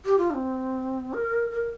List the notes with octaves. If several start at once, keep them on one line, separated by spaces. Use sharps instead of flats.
G4
F4
D4
C4
A#4
A#4